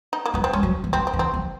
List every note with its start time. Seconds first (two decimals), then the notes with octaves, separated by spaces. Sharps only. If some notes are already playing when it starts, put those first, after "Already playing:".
0.13 D#4
0.26 A#3
0.34 F#3 B3
0.44 C4
0.53 G3 C#4
0.63 F#3
0.84 E3
0.93 F3 C4
1.07 C4
1.13 E3
1.19 C4
1.34 F3